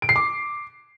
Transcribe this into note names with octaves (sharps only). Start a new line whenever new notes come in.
D7
C7
D6